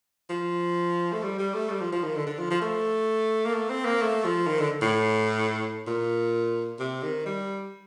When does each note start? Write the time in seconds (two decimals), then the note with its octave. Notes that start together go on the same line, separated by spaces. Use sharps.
0.30 F3
1.12 A3
1.23 G3
1.39 G3
1.54 A3
1.70 G3
1.81 F3
1.92 F3
2.04 D#3
2.16 D3
2.27 D3
2.39 F3
2.50 F3
2.62 A3
3.46 A#3
3.55 A3
3.70 C4
3.85 A#3
4.02 A3
4.25 F3
4.47 D#3
4.59 D3
4.82 A2
5.87 A#2
6.79 C3
7.03 D#3
7.26 G3